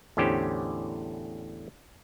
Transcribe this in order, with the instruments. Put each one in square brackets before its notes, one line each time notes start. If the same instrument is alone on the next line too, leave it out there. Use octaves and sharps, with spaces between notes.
[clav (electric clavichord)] E2 A2 D3 C#4 G4 C5